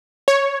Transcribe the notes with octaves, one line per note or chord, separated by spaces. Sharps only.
C#5